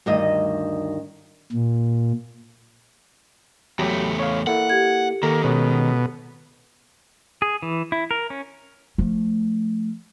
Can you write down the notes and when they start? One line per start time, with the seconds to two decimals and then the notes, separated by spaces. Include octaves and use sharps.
0.06 D2 G2 D#3 D#5
1.52 A#2
3.79 E2 F#3 A3 G4 B5
4.19 C#5 F5
4.47 A#3 E4 A4 F#5
4.70 G4 G#6
5.23 D#3 A#3 A4
5.44 B2 G#3 C#4 F#4
7.42 G#4
7.63 E3
7.92 E4
8.11 A#4
8.30 C#4
8.98 F3 A3